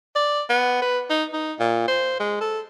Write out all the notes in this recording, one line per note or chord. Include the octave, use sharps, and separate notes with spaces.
D5
B3
B4
D#4
D#4
A#2
C5
G#3
A4